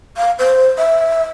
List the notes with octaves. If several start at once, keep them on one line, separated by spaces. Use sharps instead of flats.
F5
C5
E5